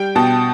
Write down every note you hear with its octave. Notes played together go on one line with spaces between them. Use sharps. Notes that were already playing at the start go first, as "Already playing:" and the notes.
Already playing: G3 G5
B2 A5